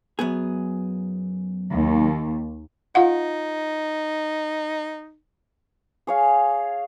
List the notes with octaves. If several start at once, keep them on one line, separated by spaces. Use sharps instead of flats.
F#2 B3 G#4
D#2
D#4 F4 F5 F#5
G#4 C#5 F5